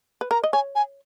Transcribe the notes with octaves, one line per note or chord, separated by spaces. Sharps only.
B4
A#4 A#5
D#5
C#5 G#5
G#5